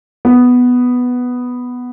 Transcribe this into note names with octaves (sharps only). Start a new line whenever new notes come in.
B3